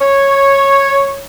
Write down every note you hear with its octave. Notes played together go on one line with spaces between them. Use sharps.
C#5